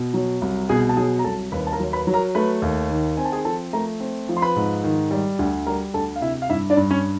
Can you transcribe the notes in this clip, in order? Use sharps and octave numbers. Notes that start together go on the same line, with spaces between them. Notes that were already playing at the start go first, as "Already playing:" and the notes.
Already playing: B2
F#3
C2
B2 G#4 G#5
A5
F#3 G#4 G#5
A#5
C2 A4 A5
D#2 B4 B5
A5
A#4 A#5
F#3
B4 B5
F#3
A#4 A#5
A3 B4 B5
D#2
D#3
C4 G#5
A5
G#4 G#5
F3 A4 A5
A3 A#4 A#5
C4
F3
C6
B4 B5
G#2
D#3
G3
D2
G3 A#4 A#5
D2 A4 A5
F5
C3 E4 E5
F5
G2 E4 E5
D4 D5
G2
C#4 C#5